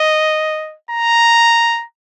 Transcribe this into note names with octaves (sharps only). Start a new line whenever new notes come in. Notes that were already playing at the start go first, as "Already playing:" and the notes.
Already playing: D#5
A#5